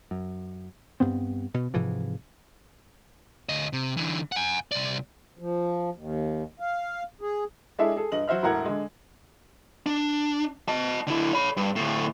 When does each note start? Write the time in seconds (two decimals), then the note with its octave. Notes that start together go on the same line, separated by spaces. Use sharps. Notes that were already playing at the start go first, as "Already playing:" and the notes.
0.11 F#2
1.00 G2 B3 C4
1.54 B2
1.74 G#2 C3 E3 F3
3.49 D2 D#5
3.73 C3
3.97 D3 E3
4.32 F#5 G#5
4.72 C2 D5
5.39 F3
5.95 D#2
6.60 F5
7.21 G#4
7.79 G#3 D4 E4 G#4 A4 E5
7.97 G#4 A4
8.12 G2 D#5 F#7
8.28 F#3 F#4 C5 E5 F6
8.43 E1 A2 A#4 F#5 A#5 G#6
8.65 D3 G#3
9.86 D4
10.68 D#5 A5
11.07 D3 E4
11.33 C#5 B5
11.57 G2
11.76 D2 A2